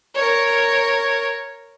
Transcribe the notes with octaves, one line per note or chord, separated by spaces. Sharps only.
A#4 C#5